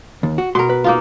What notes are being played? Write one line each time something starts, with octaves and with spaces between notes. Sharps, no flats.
D#2
F#4
B2 A#4 C6
B4
A#3 D#4 F4